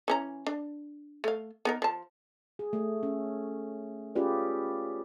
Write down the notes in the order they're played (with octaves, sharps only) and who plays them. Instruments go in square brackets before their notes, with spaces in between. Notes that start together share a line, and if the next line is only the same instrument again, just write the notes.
[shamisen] E3 C#4 A#5
D4
A3 F5
B3 D#4 A#4
F3 A5
[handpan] G#4
A3
C#4
C#4 F4 G4 G#4 B4 D5